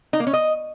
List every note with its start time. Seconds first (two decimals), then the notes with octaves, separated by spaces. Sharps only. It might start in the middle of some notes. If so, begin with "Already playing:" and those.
0.13 D#4
0.20 A#3
0.27 C#4
0.33 D#5